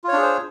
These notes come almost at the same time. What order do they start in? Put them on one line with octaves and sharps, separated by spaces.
F4 C#5 D4 G#4 C5